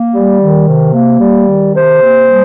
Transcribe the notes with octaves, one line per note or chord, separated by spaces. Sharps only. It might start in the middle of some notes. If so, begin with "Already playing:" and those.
Already playing: A#3
G3
D#3
C3
A#3
G3
D#3
C3 C5
A#3
G3